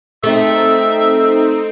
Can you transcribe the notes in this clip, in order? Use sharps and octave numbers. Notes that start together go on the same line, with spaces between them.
A3 C4 D#4 E5